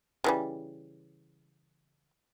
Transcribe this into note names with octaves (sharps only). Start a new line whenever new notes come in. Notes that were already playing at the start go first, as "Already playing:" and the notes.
C#3 E3 G3